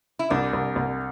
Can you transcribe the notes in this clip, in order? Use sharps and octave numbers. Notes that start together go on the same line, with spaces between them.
E4
C2 D4
C2
C2